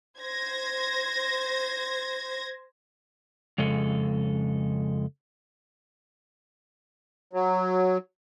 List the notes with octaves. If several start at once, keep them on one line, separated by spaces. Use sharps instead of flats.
C5 G#6 A#6
F2 C#3 G#3 A4
F#3